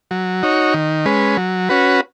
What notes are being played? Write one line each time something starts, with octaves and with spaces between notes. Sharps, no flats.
F#3
D#4 F#4 C#5
D#3
G#3 C#4 B4
F#3
C#4 F#4 B4